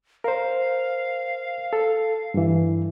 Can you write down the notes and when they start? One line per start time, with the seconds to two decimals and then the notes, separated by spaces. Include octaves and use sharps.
0.24 A#4 C5 F5
1.73 A4
2.34 G2 E3